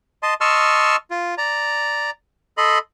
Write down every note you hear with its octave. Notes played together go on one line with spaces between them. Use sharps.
D#5 A5 C6
D#5 A5 C6 C#6 E6 F6
F4
D5 A#5
A4 D#5 B5 C6